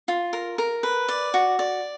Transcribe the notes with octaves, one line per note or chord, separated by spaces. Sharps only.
F4
A#4
A#4
B4
D5
F#4
D5